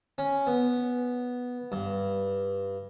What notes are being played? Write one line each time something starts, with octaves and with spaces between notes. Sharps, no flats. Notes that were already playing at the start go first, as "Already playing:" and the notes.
C#4
B3
G2